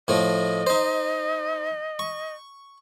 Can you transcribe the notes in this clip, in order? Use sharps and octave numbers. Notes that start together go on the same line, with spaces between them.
A2 F3 A3 D#5
D#4 C5
C#6